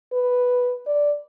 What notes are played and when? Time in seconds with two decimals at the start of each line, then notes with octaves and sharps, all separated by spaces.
0.13 B4
0.87 D5